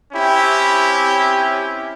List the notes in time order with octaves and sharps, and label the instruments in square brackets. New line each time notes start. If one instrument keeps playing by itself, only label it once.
[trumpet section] C4 C#4 E4 G4